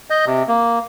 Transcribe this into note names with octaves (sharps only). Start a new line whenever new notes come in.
D#5 G6
C3
A#3